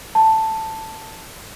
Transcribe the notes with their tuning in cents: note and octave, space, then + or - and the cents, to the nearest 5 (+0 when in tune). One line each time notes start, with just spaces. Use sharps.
A5 +5